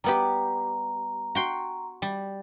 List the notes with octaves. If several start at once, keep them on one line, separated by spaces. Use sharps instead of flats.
G3 B3 G4 A#5
F#4 G5 C6
G3